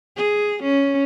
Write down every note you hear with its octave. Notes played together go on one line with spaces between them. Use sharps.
G#4
C#4